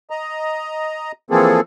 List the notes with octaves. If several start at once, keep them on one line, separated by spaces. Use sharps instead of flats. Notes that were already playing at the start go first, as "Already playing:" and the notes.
D#5 A#5
E3 F3 A#3 C4 G#4 A4